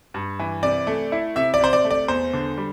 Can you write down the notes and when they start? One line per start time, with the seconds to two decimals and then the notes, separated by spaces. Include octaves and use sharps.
0.14 G2
0.39 E3
0.63 C3 D5
0.87 A3
1.12 E4
1.36 C3 E5
1.54 D5
1.60 C3 C5
1.73 D5
1.85 A3
1.91 D5
2.08 E2 C5
2.33 D3
2.57 G3